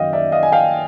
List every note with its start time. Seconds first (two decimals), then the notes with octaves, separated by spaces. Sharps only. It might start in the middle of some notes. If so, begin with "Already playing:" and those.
Already playing: F#2 D#3 D#5 F5 G5
0.13 D5 E5
0.32 D#5 F5
0.43 G#5
0.52 F5 G5